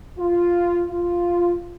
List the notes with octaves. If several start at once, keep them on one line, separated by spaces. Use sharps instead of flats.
F4
F4